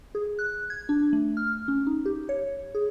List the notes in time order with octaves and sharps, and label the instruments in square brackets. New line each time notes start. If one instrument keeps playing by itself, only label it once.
[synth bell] G#4
F#6
G#6
D4
A3
F6
C#4
D#4
G4
C#5
G#4